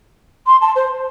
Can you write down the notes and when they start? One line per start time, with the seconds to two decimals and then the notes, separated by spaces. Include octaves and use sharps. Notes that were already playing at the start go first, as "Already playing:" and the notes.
0.47 C6
0.61 A5
0.76 C5